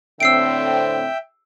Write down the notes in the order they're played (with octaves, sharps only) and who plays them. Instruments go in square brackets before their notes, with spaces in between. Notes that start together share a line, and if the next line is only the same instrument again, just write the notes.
[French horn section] A2 D3 C4 [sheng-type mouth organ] E5 G5 [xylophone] E6 C7 D7